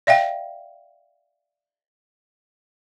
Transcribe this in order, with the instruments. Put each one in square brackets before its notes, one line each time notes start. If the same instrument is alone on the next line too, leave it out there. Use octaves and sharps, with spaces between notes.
[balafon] D5 E5 F5 G5